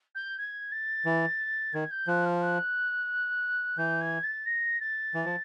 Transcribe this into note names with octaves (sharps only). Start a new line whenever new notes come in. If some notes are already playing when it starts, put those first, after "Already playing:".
G6
G#6
A6
E3
D#3 G#6
G6
F3 F#6
F6
F#6
E3 G6
G#6
A6
A#6
A6
E3
F3